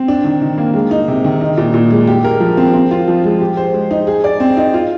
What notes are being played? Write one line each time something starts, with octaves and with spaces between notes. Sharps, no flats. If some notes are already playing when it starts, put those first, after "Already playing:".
Already playing: C4
D4
D#3
D#3
A#3
G#3
D#4
C3
D#3
D#4
A#2
A#2
G#3
G4
A#4
F3
C4
C4
F4
F3
G#3
G4
C5
G#3
D#4
G#4
D5
C4
D#4
F4